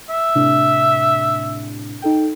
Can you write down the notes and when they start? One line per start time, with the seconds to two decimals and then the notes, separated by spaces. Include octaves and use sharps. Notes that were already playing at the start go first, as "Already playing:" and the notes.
0.10 E5
0.35 A2 C3 D4
2.02 D#4 A4 G5